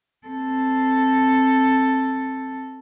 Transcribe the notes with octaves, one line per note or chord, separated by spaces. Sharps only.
C4 A4